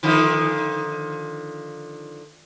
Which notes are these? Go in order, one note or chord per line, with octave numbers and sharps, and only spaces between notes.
D3 D#3 F3